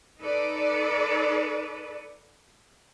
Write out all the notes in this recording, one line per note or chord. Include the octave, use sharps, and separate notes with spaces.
D#4 A4 B4 D5